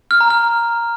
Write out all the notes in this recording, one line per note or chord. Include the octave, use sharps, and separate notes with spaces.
F6
A#5
F6